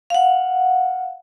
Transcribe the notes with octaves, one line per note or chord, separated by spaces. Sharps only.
F5 F#5